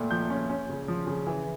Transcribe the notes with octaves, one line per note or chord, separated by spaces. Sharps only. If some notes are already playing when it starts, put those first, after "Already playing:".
Already playing: C#2 A#2 A3
F3 G6
C#4
C#4
C#3
F3
C#3
E3